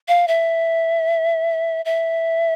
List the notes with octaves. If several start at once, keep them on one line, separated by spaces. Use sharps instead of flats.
F5
E5
E5